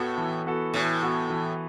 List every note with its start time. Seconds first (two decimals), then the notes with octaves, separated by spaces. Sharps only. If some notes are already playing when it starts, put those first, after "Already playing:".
Already playing: A2 B3 F#4 A4
0.18 E3
0.46 B3 F#4 A4
0.74 A2 E3
1.02 B3 F#4 A4
1.30 E3